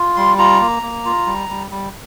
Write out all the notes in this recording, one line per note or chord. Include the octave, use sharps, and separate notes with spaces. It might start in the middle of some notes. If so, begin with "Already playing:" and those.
Already playing: F4
G3 C6
F4 A#5
A#3
A#3
F4
G3
G3
G3